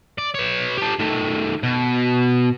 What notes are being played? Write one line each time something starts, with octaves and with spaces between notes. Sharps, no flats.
D5
B4 C#5
G4 A4
D#3 A3
B2